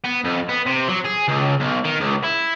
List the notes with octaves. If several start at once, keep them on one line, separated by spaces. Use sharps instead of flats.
B3
F2
B3
C3
F#3
G#4
C#2
B1
D#3
C#2
E4